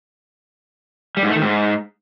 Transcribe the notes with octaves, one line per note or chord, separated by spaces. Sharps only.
G3
G#2
A3
D#3
G#2